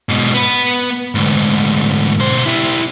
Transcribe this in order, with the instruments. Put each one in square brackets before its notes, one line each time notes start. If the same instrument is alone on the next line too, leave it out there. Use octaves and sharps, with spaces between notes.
[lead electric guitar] G#2 B2
B3 B4
D2 G#2
B2 C5
E4 G4